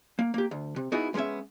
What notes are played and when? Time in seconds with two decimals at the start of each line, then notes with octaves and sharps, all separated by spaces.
0.19 A#3
0.34 A#3 G4
0.51 D2
0.76 C3
0.92 B3 D#4 E4 F#4 G#4
1.14 G#3 A#3 B3 C#4 E5